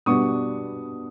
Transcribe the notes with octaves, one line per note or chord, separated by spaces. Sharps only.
B2 G3 B3 D4 C#6 D#6